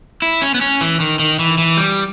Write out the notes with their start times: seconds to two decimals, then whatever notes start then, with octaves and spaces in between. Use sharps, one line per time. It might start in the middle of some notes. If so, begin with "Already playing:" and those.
0.22 E4
0.42 C#4
0.54 B3
0.61 C#4
0.81 E3
1.00 D#3
1.19 D#3
1.39 E3
1.58 E3
1.77 G3